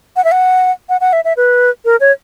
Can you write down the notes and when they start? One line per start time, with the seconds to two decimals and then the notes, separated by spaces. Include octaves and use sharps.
0.16 F#5
0.24 E5
0.32 F#5
0.89 F#5
1.01 F#5
1.13 E5
1.25 E5
1.37 B4
1.85 A#4
2.00 C#5